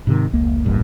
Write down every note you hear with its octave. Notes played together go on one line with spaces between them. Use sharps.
G#2 C3 D#3
F1 C#2 A#3
D1 A1 G2 A#2